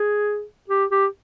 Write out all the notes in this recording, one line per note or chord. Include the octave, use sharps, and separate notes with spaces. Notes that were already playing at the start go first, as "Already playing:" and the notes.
Already playing: G#4
G4
G4